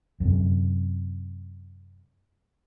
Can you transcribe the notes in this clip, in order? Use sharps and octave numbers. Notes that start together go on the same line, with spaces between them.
F#2 C3